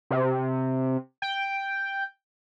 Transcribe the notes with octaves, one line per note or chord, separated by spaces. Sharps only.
C3
G5